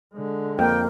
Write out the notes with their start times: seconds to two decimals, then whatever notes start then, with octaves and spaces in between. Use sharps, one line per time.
0.14 D3 G#3
0.59 F2 A#3 G5